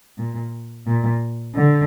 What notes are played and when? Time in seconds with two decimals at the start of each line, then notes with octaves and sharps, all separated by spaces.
0.18 A#2
0.86 A#2
1.54 D3